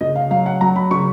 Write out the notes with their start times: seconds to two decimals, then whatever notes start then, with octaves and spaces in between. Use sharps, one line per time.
0.01 C#3 D#5
0.16 F5
0.30 F#3 F5
0.46 F#5
0.61 F#3 A#5
0.76 B5
0.91 C#3 C#6